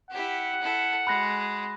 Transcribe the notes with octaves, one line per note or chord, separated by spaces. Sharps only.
E4 G4 F#5
E4 A4
G#3 F#4 B5 F#6 A#6